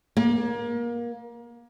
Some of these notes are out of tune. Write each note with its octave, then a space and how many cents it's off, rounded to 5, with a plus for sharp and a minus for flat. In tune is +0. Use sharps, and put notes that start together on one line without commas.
A#3 +25